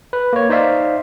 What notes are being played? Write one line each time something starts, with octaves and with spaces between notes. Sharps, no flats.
B4
A#3 C#5
D#4 C5 D5 E5 F5